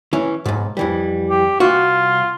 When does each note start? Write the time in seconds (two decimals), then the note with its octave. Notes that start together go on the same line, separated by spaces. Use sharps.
0.13 E3 C#4
0.46 B1 G#2
0.77 F2 E3 G3
1.30 G4
1.60 C2 F4 F#4